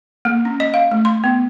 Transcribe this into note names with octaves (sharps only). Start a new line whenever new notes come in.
A#3
C#4
D#5
F5
A3
C6
B3